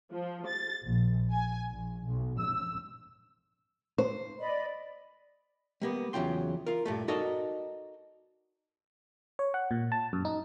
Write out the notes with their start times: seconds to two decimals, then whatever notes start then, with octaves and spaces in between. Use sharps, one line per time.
0.11 F3
0.46 A6
0.84 A#1
1.32 G#5
1.69 A#1
2.05 B1
2.39 E6
3.98 C5
4.39 D5 D#5 B5
5.81 G3 A#3 B3
6.13 E2 C#3 F#3 F4 G5 C6
6.66 F4 A#4
6.86 G2 A#2 A3
7.08 D#4 F#4 A4 A#4 D5 D#5
9.39 C#5
9.54 F#5
9.71 A#2
9.92 A5
10.13 F#2
10.25 D#4